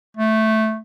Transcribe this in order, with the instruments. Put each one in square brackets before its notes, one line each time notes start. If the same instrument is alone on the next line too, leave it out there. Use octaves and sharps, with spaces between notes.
[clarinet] A3